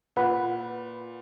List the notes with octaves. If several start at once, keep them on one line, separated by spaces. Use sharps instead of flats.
A#2 B4 F#5 B5